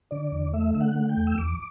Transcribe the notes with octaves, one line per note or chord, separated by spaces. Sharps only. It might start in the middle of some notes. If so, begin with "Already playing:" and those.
D3 D5
E2
A3 E5
D3 E5
F#5
A3
G5
E2
E6
E2 D6